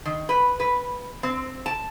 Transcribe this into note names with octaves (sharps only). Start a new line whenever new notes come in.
D#3
B4
B4
C4
A5